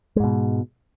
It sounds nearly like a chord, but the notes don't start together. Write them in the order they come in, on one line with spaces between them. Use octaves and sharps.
G#3 G#2 B2